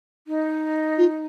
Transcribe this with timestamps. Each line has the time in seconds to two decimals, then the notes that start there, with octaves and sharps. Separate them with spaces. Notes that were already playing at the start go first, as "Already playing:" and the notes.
0.27 D#4
0.98 F4